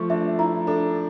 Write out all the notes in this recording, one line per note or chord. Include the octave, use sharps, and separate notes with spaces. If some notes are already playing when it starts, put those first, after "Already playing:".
Already playing: F3 A3 C#6
D4 E5
E4 A#5
D4 A4